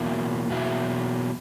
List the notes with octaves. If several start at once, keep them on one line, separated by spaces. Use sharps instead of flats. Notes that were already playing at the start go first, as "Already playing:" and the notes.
Already playing: E2 B2 F#3 A#3 E4
E2 B2 F#3 A#3 E4